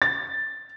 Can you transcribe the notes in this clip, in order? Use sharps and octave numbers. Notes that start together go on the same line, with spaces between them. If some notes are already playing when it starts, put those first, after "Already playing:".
A6